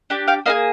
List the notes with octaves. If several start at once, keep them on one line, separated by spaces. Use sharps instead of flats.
D4 G4
F5 G5
A#3 D#4 G#4 D#5 F5